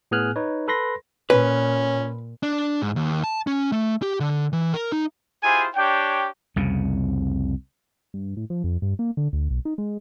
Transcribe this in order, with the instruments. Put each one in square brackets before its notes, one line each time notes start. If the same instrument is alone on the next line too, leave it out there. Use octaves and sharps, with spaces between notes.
[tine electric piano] A2 B3 G#4 G#5 F6 F#6
D#4 B4 C#5
A4 B4 B5 C6 A#6
[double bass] A#2 [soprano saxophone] C#4 [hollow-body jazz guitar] B4
[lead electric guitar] D4
G#2
D#2
A5
C#4
A3
G4
D3
E3
A#4
D#4
[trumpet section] E4 F4 G4 G#4 C5 G#5
D4 G4 C#5 G5
[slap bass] C2 F2 C#3
[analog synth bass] G2
A2
F3
F2
G2
A#3
D3
D2
B1
D#4
G#3